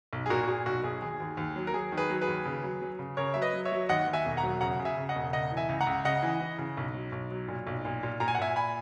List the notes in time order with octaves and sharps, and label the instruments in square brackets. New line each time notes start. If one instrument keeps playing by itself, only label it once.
[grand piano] B1
G#4
A#2 F#4 A#4
F#4
A#2 G#4
B1 F#4
B1 G#4
D#2 G#4
D#2
D#2
F#3
A#4
F#3 G#4
D#3
G#4 B4
F#3
G#4 B4
D#2
C#3
F#3
F#3
C#3
C#3 A#4 C#5
F#3 E5
B4 D#5
F#3
C#5 E5
F#3
D#2 D#5 F#5
D#2
E5 G#5
E1
F#5 A#5
F#3
C#3 F#5 A#5
C#3
E5 G#5
C#3
D#5 F#5
E1
C#2 D#5 F#5
E3
E5 G#5
C#2
F#5 A#5
C#2
C#3 D#5 F#5
E3
E3
C#3
B1
F#3
B1
F#3
A#2
B1
A#2
A#2
A#2 A#5
G#5
F#5
A#2 E5 G#5
G#5 B5